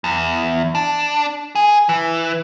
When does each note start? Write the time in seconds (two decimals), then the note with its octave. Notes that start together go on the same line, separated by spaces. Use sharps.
0.04 E2
0.75 D4
1.55 G#4
1.89 E3